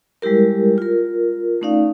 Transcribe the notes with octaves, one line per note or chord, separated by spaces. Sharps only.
G3 G#3 E4 G4 A#4
F4 A#4
A3 C#4 D#4 D5 F5